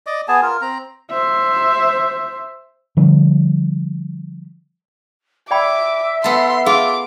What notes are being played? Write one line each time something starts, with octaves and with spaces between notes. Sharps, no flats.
D5 D#5 D6
B3 G#4 G#5 A5
F4 A#4
C4 A#5
C5 E5
D3 F3 G3
D5 E5 G5 B5 D6
B3 A4 C6
F4 G#4 D6